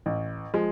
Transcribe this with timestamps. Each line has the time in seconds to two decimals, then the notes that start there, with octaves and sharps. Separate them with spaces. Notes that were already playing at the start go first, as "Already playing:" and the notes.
0.06 A1
0.54 F3 G#3